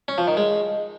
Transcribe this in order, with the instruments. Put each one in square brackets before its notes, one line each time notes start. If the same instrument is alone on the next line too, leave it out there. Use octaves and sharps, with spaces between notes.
[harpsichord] C#4
F3
D#3
G#3